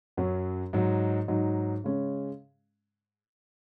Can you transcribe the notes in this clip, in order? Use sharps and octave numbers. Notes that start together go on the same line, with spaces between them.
F#2 F#3 C#4
G#2 F#3 D#4
G#2 F#3 D#4
C#3 G#3 C#4